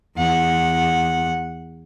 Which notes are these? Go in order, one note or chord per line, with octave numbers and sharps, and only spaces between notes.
E2 F#5